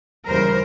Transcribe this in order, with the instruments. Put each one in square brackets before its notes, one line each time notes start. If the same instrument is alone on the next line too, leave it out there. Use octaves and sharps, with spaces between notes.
[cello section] D#2 C#3 E3 G3 A#4 C5